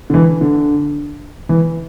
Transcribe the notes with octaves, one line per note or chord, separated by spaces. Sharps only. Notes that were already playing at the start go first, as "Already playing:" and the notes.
D3
E3
D3
E3